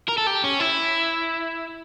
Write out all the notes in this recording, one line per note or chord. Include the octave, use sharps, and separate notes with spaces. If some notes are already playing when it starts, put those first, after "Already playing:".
A#4
A4
G4
C#4
E4